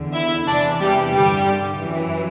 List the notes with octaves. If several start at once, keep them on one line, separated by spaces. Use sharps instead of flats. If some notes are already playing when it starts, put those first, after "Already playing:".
Already playing: E2 D3
E4 E5
E2 C3 E3 D4 D5
G3 G4
G2 D3 G3 G4
F#2 E3